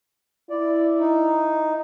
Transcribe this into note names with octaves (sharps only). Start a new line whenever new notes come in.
E4 D5
D#4